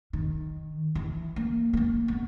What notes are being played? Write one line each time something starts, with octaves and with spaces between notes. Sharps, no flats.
D#3
E3
A#3
B3
A#3
B3